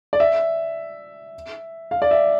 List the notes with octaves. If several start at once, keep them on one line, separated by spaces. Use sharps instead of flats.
D5
E5
F5
D5
E5